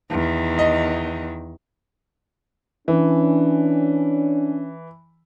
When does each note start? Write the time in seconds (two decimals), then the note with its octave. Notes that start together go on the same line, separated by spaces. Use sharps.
0.11 E2 D#3
0.59 D#5
2.88 E3 C#4 D4